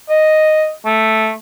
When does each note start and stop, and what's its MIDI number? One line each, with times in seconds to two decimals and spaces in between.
0.10 0.71 75
0.85 1.33 57